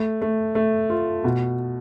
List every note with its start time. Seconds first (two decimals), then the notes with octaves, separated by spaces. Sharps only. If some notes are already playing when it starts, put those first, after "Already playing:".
Already playing: A3
0.22 A3
0.55 A3
0.90 F4
1.24 B2